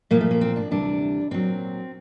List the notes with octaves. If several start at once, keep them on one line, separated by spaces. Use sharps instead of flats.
A#2 F3 A#3
A3
A#3
C4
D4
D2 C3 E3 G3 D4
A#2 F#3 C4